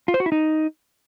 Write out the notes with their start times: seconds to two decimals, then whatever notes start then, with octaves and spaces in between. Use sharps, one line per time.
0.08 F4
0.14 C5
0.20 F#4
0.26 E4
0.32 D#4